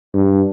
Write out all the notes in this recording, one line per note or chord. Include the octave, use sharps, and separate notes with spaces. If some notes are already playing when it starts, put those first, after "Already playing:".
G2